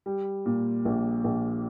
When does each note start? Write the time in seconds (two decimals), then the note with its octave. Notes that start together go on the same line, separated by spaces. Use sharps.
0.06 G3
0.46 A#2
0.85 A#1
1.24 A#1